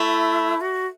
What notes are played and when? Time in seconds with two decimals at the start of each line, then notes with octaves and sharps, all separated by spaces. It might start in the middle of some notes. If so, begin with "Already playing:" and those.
Already playing: A3 E4
0.61 F#4